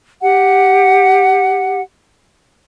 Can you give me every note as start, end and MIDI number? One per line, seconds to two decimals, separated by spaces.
0.22 1.79 67
0.22 1.79 78